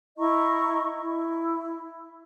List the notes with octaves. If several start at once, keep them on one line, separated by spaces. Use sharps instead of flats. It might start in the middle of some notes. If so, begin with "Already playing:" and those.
E4 D#5 A#5 C#6
E4